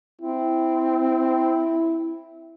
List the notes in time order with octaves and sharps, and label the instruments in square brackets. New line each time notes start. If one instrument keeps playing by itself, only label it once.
[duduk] C4 [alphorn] E4